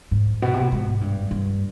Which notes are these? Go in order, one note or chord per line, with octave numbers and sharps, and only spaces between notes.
G#2
B2
C3
B2
G#2
G2
G2